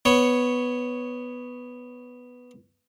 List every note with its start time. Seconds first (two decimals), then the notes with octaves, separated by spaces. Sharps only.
0.05 B3 C#5